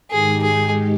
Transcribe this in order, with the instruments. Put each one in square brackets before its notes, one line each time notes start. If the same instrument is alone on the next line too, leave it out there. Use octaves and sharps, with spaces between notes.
[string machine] G#2 D#3 G#3 D#4 G4 [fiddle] G#4
[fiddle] G#4